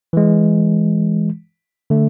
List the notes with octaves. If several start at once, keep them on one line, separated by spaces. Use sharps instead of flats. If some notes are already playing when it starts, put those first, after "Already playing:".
E3 G#3
D3 A3